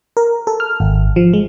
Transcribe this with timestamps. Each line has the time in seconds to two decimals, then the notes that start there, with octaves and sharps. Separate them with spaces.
0.17 A#4
0.47 A4
0.60 F6
0.80 G#1
1.16 F3
1.33 G#3